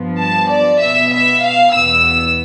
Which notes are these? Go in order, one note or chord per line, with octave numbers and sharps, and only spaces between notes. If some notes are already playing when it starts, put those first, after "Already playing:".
Already playing: G2 F3 B3
A5
D5
B2 B3 E5
E5
F5
E2 B2 B3 E6